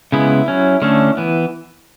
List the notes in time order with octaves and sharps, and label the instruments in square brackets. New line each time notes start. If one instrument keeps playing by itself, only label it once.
[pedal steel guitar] C#3 G#3 B3 E4
F#3 C#4
D3 A3 C#4
E3 B3